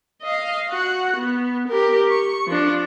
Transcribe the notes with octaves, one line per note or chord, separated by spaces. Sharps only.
D#5 F5
F#4 F#5
B3
G4 A#4
C#6
F3 D4